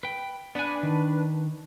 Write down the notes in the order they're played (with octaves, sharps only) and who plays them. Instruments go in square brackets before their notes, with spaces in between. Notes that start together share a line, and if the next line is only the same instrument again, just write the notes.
[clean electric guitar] B4 G5
[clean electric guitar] B3 G#5 [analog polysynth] D4 B4
[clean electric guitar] D#3